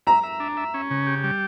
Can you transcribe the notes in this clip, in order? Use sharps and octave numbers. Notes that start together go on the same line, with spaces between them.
E5 A#5
E5
D4
E5
C#4
C#3
G4
G3